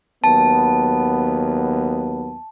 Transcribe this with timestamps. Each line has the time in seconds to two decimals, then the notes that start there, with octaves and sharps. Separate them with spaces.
0.24 D#2 F#3 B3 A5